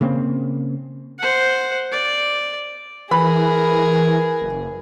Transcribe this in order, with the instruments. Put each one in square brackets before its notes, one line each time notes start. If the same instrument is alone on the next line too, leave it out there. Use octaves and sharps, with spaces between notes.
[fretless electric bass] C#3 A#3 C4
[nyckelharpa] C5 F#5
D5
[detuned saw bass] E3 [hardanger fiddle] G#4 A#4 [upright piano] B4 B5
[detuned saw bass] F#1